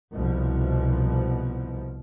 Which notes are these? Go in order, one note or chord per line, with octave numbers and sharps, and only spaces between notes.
C2 B2 F3